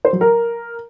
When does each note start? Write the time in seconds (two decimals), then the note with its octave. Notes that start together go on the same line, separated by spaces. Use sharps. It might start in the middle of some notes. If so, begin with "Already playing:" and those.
0.05 C5
0.13 F#3
0.21 A#4